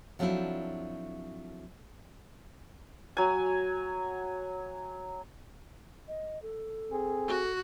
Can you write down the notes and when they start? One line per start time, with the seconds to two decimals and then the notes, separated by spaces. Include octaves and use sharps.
0.19 F3 F#3 A3 C4 D4 E4
3.17 F#3 G#5
6.08 D#5
6.42 A4
6.90 C4 G#4
7.28 F#4